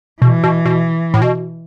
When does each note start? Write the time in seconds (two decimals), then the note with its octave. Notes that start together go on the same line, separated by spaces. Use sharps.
0.21 B2 E3
0.44 B2
0.65 B2
1.14 A2
1.22 B2